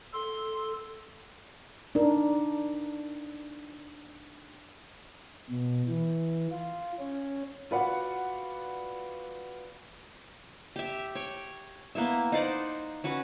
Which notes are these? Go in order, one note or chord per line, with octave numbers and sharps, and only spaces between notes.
A4 C6
D4 D#4 A#4
B2
E3
F4
C#4
F4 F#4 B4 D5 F#5
G4 E5
C#5 G5
A#3 B3 E4 E5
D#4 C5 D5 F#5
C#4 F#4 B4 F#5